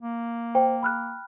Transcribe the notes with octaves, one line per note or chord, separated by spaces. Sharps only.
A#3
C5 G5
B5 F6 F#6